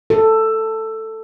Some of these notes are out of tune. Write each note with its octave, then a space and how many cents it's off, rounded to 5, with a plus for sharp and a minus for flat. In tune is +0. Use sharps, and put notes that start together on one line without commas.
A4 +10